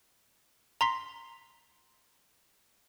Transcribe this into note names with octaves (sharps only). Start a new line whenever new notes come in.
A#5 C6 B6